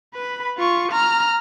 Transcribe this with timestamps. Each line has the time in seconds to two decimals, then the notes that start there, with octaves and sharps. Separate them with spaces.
0.14 B4 B5
0.58 F4 C#6
0.92 A#5 F6